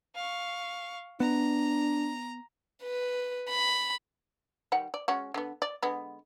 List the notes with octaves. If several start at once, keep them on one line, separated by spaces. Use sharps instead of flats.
F5 C#6
B3 D4 A#5
B4
B5
D#3 G3 F#5
D5
G#3 C#4 F#4
D3 B3
D5
D3 G#3 B3